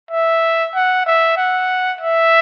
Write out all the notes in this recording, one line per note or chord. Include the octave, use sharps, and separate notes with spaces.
E5
F#5
E5
F#5
E5